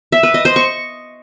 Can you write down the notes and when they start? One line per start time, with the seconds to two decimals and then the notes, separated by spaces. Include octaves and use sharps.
0.12 E5
0.23 B4
0.34 D#5
0.45 C5
0.56 C#6